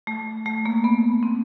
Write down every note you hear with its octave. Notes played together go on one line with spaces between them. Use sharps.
A3
A3
A#3
B3
C4